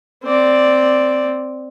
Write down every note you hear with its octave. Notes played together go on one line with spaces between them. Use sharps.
C4 D5